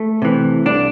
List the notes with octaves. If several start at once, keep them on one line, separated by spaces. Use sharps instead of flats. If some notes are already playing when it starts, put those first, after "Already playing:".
Already playing: A3
C3 E3
C2 D4